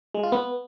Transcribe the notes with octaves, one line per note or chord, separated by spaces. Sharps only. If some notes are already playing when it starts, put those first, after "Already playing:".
G#3
F4
B3